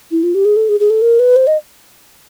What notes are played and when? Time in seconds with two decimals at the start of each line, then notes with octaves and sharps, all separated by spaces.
0.11 E4
0.23 F4
0.35 G4
0.45 G#4
0.56 A4
0.69 G#4
0.80 G#4
0.90 A4
1.02 A#4
1.19 B4
1.36 C5
1.47 D#5